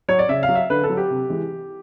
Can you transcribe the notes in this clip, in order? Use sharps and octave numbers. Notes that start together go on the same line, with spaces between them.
F#3 C#5
D5
C#3 E5
F5
F#3
E5
D3 B4
A4
F#3
G4
C3
E3 G#3